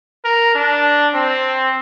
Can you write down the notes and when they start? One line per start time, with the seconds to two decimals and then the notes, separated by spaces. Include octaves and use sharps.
0.25 A#4
0.55 D4
1.14 C4